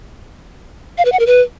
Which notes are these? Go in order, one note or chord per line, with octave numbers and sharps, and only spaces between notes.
F5
B4
F#5
A#4
B4